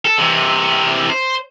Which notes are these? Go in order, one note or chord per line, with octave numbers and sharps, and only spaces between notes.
A4
C3 E3
C5